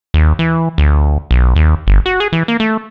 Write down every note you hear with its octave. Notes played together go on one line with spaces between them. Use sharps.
D#2
E3
D2
B1
D#2
G1
F#4
G#4
E3
A#3
A3